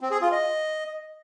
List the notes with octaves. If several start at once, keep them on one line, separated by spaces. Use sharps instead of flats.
C4
G#4
F4
D#5